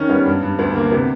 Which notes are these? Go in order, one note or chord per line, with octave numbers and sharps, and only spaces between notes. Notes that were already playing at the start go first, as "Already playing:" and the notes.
Already playing: D#3 C#4
G3 B3
G2
G2
D2 B3
D3 A#3
C3 B3